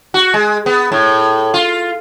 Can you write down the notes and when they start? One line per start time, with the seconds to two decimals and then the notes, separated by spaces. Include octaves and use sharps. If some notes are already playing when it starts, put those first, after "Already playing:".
0.14 F#4
0.34 G#3
0.66 B3
0.92 A2
1.54 F4